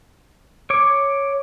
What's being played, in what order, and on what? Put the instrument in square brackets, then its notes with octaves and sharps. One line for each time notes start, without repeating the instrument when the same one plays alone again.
[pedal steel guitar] C#5 D6